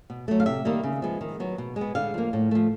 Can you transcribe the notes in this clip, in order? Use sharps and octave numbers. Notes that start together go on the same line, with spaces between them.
B2
F#3 A3
F5
C3 E5
D#3 G3 A#3
C#3
F3 G#3 B3
D#3
F#3 B3
B2
G#3
B3
D3 F5
F3 A#3
A2
F3 A3